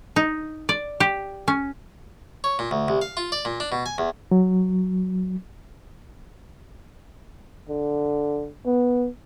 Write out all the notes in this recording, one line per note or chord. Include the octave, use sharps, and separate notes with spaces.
D#4
D5
G4
C#4
C#5
A#2
D2
C2
F5
F4
D5
A#2
D4
B2
G#5
E2
F#3
D3
B3